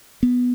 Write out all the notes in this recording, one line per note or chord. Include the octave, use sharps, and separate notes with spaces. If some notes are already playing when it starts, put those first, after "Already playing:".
B3